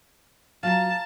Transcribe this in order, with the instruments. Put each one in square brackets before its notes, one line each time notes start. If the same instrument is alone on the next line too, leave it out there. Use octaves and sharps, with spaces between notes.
[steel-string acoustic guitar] F#3 F4 [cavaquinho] F5 A#5 [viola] A5